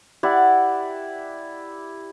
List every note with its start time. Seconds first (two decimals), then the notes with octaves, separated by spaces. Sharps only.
0.23 E4 G4 D5 F#5